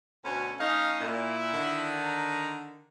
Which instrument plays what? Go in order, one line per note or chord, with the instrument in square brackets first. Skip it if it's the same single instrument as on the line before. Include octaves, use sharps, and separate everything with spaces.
[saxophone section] D2 B2 C#4
[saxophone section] A3 C#4 D#4 [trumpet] F5
[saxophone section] A#2 [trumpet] E4
[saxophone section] D3 D#3
[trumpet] A#5